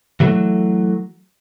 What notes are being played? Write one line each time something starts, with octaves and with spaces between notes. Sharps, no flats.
E3 F#3 A3